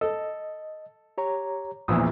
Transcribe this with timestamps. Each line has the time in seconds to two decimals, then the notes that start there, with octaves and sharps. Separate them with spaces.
0.01 A4 D#5
1.18 G4 C#5 A#5
1.88 A#1 E2 A#2 D#6 E6